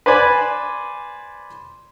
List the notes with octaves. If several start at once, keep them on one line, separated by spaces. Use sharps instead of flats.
B4 C5 D5 G#5 B5